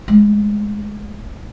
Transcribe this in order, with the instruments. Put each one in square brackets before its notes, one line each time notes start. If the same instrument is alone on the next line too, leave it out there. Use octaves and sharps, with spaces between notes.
[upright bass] G#3 A3